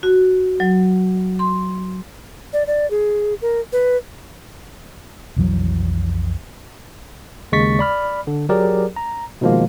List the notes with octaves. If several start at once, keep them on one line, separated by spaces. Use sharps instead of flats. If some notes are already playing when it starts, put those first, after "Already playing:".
F#4
F#3
C6
D5
D5
G#4
A#4
B4
B1 F2 E3 F#3
D#2 C#3 G#3 C#6 A6 B6
D5 B5 F6
D3
F#3 G4 G#4 A#4 D5
A#5
B2 D#3 F3 G#3 A#3